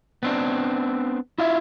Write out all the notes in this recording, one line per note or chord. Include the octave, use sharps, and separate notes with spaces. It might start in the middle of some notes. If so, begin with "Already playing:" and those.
B3 C4 D4
E4 F4 E5